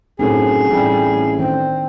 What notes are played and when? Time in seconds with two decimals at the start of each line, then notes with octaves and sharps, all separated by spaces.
0.19 F#2 A2 C4 D#4 G#4 A4
0.69 A1 A2 G3
1.39 D#3 C4 D4